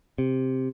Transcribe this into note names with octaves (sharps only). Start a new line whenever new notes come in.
C3